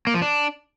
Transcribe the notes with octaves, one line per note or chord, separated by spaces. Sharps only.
A#3
F3
D4